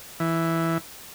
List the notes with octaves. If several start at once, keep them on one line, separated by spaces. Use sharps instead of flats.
E3